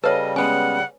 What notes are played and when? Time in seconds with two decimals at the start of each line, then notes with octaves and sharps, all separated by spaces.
0.04 C#3 G3 A4 B4 C#5 D#5 F5
0.36 G#3 B3 C#4 F#5 G#5